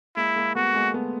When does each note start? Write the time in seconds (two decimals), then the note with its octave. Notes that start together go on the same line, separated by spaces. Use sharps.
0.16 G#3 A#3 E4
0.36 G#3 A#3
0.55 A3 B3 F#4
0.75 G#3 A#3
0.94 A3 B3